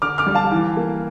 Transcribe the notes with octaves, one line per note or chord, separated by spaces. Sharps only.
D3 D6 F6
D6 F6
G3
F5 A5
E3
A#3